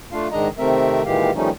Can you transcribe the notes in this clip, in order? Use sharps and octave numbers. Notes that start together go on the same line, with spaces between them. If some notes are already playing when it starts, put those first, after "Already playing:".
A3 D4 F4 F5
G#2 D#3 G#3 D4 D#5 A#5
C3 D#3 A3 C4 A#4 E5
A#2 D#3 E3 G#3 G4 F5
D#3 F3 G3 A3 C#4 D#4